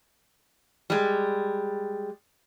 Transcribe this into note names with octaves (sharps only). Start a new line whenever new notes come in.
G3 G#3